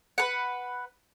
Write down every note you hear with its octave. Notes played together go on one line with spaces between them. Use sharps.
B4 F#5